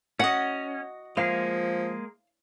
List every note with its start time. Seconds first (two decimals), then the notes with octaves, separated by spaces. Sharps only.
0.19 C#4 F#4 D#5 F#5
1.17 F3 G#3 A#3 G#4 F5